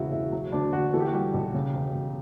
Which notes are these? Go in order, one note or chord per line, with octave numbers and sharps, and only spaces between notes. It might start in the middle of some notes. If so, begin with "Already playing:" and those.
Already playing: E1 C#3 E4 F#4
E1 E4
F#3
D2 D4
D2 F#4
E3 A4
G4
F#4
G3 G4
B1
C#3
E1
E1